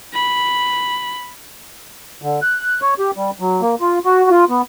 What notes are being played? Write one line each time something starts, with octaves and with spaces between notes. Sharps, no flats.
B5
D3
F#6
C#5
G4
G3
F#3
A#3
F4
F#4
F4
B3